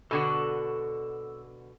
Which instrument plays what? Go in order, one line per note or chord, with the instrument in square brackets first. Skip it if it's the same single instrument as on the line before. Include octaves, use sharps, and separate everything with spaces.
[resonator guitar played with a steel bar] B2 D3 F#4 [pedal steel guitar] A4 A5